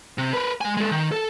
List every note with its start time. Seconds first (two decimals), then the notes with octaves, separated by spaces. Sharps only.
0.18 C3
0.33 A#4 B4
0.61 G#3 G#5
0.77 G#3 A4
0.91 D#3
1.12 A4